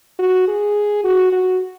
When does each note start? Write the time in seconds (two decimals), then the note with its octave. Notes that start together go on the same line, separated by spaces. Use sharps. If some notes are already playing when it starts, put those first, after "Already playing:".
0.19 F#4
0.48 G#4
1.04 F#4
1.32 F#4